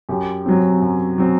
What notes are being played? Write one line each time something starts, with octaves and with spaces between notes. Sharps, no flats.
F#2 G4
F#3 C4
F#2
F#3 C4